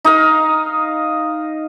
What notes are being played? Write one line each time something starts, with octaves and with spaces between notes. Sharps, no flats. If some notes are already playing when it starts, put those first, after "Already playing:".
D#4 D#5 F5